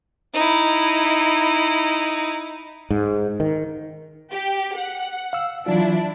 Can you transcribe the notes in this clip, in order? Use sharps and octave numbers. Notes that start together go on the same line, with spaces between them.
D#4 E4
G#2
D#3
G4
F#5
F5 E6
E3 F#3 D4 E4 F4